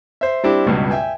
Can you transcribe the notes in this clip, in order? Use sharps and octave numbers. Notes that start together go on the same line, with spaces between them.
C5 E5
G3 C4 D4 E4 G4
C#2 G2 B2
E5 G5 G#5